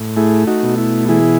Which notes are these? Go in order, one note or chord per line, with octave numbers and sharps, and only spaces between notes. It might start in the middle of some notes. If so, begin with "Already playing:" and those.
Already playing: A2
A3 E4 G#4
D#4 F#4
B2
E4
E3 E4 G#4